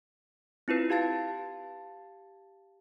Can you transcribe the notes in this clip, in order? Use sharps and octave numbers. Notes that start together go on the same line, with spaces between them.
C4 E4 F4 B4
G4 F5 A5 A6